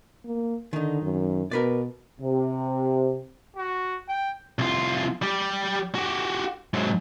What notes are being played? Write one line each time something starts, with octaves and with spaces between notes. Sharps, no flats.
A#3
D3 D#3 D#4
F#2
B2 A#4 B4 D5
C3
F#4
G5
C2 F4
G3 G4
F#4 G4
G#2 F#3